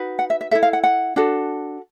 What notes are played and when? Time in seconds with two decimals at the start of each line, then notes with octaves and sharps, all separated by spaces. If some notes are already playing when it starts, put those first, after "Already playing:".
Already playing: D#4 F#4 B4
0.19 F#5
0.30 E5
0.41 E5
0.51 E4 A4 E5
0.63 F5
0.73 F#5
0.84 F#5
1.16 D4 F#4 A4